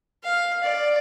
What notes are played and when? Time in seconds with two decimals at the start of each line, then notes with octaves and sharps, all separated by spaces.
0.24 F5
0.63 D5